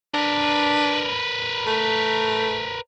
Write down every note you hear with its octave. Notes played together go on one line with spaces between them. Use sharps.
D4 A#4 B4
A3